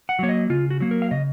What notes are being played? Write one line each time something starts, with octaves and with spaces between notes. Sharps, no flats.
F#5
F#3 A#3 C#5
D#5
C#3 F4
F#4
F#3 A#3
A#4
F5
C#3 D#5